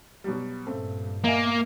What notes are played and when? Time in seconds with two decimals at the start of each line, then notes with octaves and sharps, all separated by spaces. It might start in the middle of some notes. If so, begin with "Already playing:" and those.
0.24 B2 F#3 G3
0.67 G2 A#2 C#3 A3 C4
1.24 A#3 D#5 E5 G#5